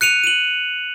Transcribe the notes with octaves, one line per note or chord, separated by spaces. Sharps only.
F#6 C#7 D#7 F7
D#7 F#7